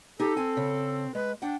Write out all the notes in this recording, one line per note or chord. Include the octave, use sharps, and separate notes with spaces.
D#4 G4 A4
C4 G#5
C#3
G#3 B4
D4 F#5 G5